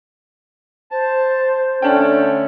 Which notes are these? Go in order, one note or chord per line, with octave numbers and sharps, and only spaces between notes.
C5 A5
D3 A3 C#4 D4 G5